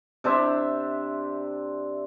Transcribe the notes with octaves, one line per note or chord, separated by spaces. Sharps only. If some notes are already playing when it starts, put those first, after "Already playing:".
C3 D4 C5 E5